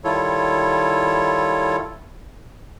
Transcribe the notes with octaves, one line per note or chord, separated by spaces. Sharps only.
D#3 G3 E4 F4 A4 C#5